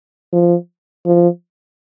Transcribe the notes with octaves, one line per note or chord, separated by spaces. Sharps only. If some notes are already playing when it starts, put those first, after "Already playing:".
F3
F3